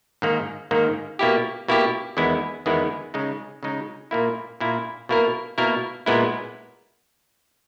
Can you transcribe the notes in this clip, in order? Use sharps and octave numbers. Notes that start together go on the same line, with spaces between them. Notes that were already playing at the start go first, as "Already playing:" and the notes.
G#2 D#3 A#3
G#2 D#3 A#3
B2 A#3 E4 G4
B2 A#3 E4 G4
E2 D#3 G#3 B3 E4
E2 D#3 G#3 B3 E4
C#3 G#3 D#4
C#3 G#3 D#4
A#2 A#3 E4
A#2 A#3 E4
B2 A#3 E4 A#4
B2 A#3 E4 A#4
A#2 G#3 B3 E4